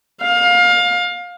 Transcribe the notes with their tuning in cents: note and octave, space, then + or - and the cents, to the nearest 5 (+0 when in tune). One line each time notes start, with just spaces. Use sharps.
F5 +25